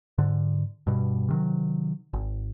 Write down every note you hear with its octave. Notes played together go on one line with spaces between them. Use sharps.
G#2 D3
G2 B2
C3 D#3 F#3
G#1